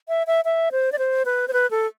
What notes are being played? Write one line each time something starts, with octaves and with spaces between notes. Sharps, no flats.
E5
E5
E5
C5
D5
C5
B4
C5
B4
A4